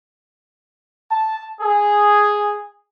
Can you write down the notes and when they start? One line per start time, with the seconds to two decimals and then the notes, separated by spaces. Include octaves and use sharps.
1.12 A5
1.61 G#4